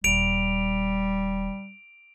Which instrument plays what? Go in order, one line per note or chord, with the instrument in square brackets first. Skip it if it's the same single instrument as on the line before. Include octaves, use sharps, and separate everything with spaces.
[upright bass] D#1 [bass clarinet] G3 [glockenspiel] D7 F7